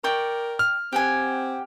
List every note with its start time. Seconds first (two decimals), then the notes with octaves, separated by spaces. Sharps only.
0.04 A#4 D5 G5 C#6
0.59 F6
0.93 C4 G4 F#5 G#5